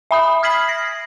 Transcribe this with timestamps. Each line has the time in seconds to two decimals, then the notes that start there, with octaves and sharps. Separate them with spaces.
0.11 E5 B5 D#6
0.43 F6 G#6 B6 C7 F#7
0.69 A#6